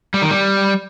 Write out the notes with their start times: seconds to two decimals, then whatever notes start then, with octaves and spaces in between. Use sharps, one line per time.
0.14 G3
0.22 D#3
0.30 G3